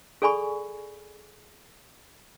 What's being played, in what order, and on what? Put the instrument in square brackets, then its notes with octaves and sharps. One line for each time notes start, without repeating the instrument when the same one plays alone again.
[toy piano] G#4 A4 D5 G#5 B5 C#6